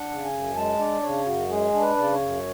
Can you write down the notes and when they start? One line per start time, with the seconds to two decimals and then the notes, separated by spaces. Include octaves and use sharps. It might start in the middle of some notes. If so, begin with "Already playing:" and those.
Already playing: D4 F#5
0.09 C#3
0.24 G#5
0.33 F#2
0.56 G#3 A5
0.79 D4 D5
1.02 C#3 C#5
1.26 F#2 F#4
1.49 G#3 G#4
1.73 D4
1.81 B4
1.97 C#3 D5
2.12 C#5
2.21 F#2